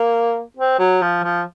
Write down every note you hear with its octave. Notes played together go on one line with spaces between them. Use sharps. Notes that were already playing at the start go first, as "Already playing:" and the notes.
Already playing: A#3
C4
F#3
F3
F3